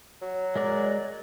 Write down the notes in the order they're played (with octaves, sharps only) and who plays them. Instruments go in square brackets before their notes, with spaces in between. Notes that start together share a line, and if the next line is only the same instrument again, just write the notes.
[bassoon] F#3
[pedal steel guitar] G#3 A#4 D5